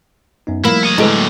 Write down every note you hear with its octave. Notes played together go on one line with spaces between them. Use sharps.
F#2 B3 D#4
F3 G3 A#3 E4
C#5 D#5
A2 D3 G#3 E4 A4 B4
F#3 A#3